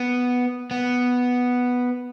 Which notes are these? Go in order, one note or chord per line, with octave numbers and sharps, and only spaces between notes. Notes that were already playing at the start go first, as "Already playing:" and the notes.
Already playing: B3
B3